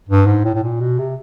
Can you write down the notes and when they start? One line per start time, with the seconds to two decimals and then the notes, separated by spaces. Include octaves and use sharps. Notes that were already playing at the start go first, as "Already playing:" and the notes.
0.09 G2
0.26 G#2
0.44 A2
0.55 A2
0.63 A#2
0.80 B2
0.99 C3